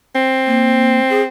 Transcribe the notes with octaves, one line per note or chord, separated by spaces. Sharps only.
C4
A#3
G#4